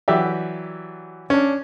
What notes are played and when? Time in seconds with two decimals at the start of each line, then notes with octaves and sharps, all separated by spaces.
0.08 E3 F#3 G4 D5 E5
1.30 C#4 D4